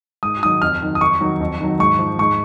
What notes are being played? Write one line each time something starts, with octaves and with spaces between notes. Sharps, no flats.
G#2 D#6
D#3 F#3 D#6
F2 F6
D#3 F#3
D#6
F2 C#6
D#3 F#3
F2
D#3 F#3
G#2 C#6
F3
G#2 C#6